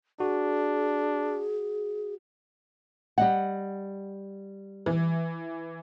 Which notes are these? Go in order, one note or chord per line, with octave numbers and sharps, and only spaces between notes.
D4 F#4 G#4
G3 D#5 F#5
E3